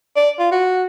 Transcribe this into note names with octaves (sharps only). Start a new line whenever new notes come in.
D5
F4
F#4